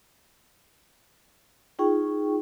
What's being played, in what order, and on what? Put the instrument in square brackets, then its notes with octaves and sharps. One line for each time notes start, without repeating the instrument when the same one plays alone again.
[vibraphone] D#4 F4 G#4 G5 C#6